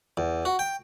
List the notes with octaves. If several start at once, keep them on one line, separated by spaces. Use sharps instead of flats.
E2
F#4
G5